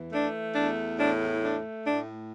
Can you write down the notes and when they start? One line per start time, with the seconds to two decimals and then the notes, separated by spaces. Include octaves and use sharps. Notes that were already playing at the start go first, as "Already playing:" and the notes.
Already playing: E2 E3
0.11 A3 D4
0.54 E2 D4
0.98 A2 D4
1.41 A3 D4
1.84 A2 D4